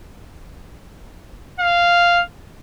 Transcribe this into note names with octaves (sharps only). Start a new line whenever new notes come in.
F5